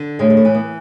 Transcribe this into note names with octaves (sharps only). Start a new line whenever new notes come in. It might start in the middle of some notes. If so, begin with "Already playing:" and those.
Already playing: D3
A2 G#3
G#3
A3
E3
B3